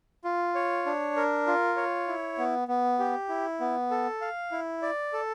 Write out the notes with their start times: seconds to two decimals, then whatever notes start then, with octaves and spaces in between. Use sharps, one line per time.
0.24 F4
0.55 C#5
0.86 D4
1.16 A#4
1.47 F4
1.77 C#5
2.08 E4
2.38 B3
2.68 B3
2.99 G4
3.29 E4
3.60 B3
3.91 A4
4.21 F5
4.52 E4
4.82 D5
5.13 A4